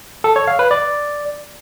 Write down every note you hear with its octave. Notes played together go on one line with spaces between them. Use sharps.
A4
C#5
F5
B4
D5